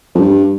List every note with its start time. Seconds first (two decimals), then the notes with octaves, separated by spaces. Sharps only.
0.15 F2
0.20 G2